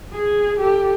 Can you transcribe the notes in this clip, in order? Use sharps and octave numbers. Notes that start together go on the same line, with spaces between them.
G#4
G4 A4